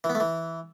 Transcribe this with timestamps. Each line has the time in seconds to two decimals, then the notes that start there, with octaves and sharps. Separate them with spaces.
0.04 E3
0.10 B3
0.15 A3
0.20 E3